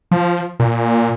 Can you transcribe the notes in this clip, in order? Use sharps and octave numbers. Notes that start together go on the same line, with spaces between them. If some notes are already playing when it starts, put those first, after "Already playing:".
F3
A#2